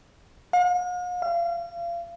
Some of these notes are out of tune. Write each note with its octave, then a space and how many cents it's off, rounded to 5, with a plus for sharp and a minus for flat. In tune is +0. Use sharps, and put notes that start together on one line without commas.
F5 +45
F5 -35